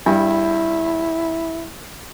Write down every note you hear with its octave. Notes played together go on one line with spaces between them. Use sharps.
G2 E4